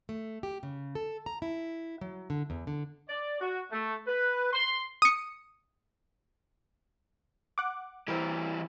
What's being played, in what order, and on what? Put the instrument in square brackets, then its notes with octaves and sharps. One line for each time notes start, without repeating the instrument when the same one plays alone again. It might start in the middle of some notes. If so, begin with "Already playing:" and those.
[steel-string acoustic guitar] A3
G4
C#3
A4
A#5
E4
F#3
D3
E2
D3
[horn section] D5
F#4
A3
B4
C6
[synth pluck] D#6 C#7
[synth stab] F#5 D6
[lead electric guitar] E3 G3 [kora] C4 E4 A#4